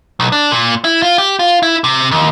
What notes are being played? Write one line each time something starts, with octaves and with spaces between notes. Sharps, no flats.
B1
D4
A#2
E4
F4
G4
F4
E4
C3
D#2